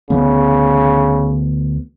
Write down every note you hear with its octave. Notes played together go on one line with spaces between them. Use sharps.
D2 C#3 E3 B3